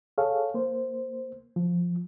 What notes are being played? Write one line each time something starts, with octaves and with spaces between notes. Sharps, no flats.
G#4 A4 C#5 F5
A#3 C5
F3